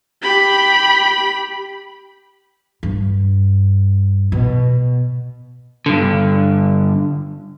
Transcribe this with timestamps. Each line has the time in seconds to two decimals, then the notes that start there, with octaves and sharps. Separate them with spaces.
0.23 G4 B5
2.83 G2
4.32 B2
5.86 G2 D3